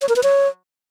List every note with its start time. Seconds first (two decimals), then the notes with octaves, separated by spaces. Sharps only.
0.02 C#5
0.09 A#4
0.16 B4
0.23 C#5